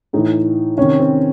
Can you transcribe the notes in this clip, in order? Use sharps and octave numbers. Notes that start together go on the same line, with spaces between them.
A2 E3 D#4
C3 D#3 C#4
C4